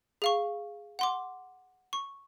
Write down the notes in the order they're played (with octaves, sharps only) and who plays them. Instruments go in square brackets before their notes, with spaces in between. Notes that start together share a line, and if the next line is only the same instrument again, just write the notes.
[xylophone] G#4 F5 C#6
F#5 C6 D6
C#6